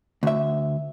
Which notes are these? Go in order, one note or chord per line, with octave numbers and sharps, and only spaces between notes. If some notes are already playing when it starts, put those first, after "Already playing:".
D2 E5